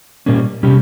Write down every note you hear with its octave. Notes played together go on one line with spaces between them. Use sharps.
A#2 G3 A#3 C#4
C3 G3 C#4 G4